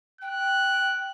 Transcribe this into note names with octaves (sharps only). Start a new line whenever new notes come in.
G5 F#6